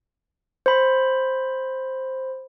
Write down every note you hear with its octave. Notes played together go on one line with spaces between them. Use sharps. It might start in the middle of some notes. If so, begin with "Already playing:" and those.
C5 B5